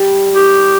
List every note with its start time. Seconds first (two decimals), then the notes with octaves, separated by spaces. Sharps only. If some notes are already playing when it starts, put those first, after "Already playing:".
Already playing: G3
0.35 G4